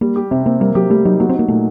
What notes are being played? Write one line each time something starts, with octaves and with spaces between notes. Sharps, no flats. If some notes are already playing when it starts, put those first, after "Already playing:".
G3 A#3
G4
C3 C4
A#3 C4
G3 A#3
F#3 G4
G3 A3
F#3 D#4
F#3 A#3
C4
A#3 D#4
A#2 A3